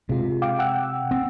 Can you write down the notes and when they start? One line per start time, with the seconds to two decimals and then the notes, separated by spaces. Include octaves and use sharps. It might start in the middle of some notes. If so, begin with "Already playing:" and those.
0.09 C3 G#3 F4
0.42 F5 G5 D6
0.59 F#5 G5 E6
1.11 C4